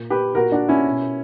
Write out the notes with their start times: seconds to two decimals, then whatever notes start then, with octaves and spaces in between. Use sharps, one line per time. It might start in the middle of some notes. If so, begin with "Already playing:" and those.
Already playing: A#2
0.10 G4 B4
0.35 A#2 F#4 A#4
0.52 D4 F#4
0.68 C#4 E4
0.86 B2